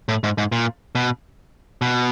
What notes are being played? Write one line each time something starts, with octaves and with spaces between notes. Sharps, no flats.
A2
G#2
G#2
A#2
B2
B2